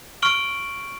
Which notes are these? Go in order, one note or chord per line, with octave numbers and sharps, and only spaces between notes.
C#6 F6 D7 F#7 G7